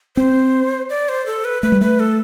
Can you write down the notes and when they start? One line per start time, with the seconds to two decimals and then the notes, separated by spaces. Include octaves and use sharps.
0.16 C4 C5
0.90 D5
1.09 C5
1.26 A4
1.45 B4
1.62 A3 B4
1.72 G3
1.81 A3 B4
2.00 A4